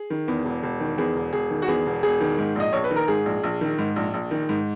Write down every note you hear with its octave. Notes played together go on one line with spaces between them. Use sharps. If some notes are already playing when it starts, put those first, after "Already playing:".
Already playing: G#4
D#3
E2
E1
E1
D#3
E2 G#4
E1
E1 G#4
D#3
F#4
E2 G#4
E1
E1 G#4
D#3
G#2
A#1 D#5
A#1 C#5
B4
D#3
A#4
G#2 G#4
A#1
A#1
D#3
G#2
A#1
A#1
D#3
G#2